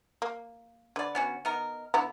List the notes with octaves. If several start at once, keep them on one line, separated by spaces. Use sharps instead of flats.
A#3
D3 B4 D5
B3 C#4 F#4
B3 D#4 A#4
D3 B3 E4 A#5